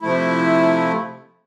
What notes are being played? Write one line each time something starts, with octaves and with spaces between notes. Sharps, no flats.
C3 F3 A3 E4